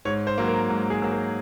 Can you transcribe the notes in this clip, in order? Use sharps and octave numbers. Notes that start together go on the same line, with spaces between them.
G#2 C#5
C5
F#3 A#3
A#4
G#2
G#4
F#3 A#3
A#4